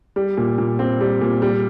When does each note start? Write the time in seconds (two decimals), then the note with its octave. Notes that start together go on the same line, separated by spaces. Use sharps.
0.16 G3
0.37 A#2
0.58 A#2
0.79 C4
1.01 G3
1.21 A#2
1.42 G3